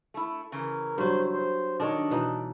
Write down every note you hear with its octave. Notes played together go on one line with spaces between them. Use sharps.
A3 E4
C#3 E3 A#4
G2 F#3 C5
C5
D#3 D4 A4 C#5 D#5
B2 E3 D#4